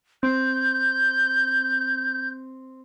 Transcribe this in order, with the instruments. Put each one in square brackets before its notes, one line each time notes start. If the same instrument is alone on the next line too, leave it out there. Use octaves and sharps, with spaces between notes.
[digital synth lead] C4 [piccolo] G6